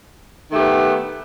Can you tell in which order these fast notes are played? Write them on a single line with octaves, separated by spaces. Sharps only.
D#3 A3 G4 B3